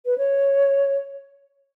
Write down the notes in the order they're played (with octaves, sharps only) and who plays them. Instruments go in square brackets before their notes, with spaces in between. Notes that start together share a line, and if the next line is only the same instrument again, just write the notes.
[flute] B4
C#5